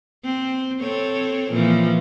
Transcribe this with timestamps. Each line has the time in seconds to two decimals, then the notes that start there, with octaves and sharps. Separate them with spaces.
0.24 C4
0.80 C4 A4 C#5
1.52 A#2 E3 F3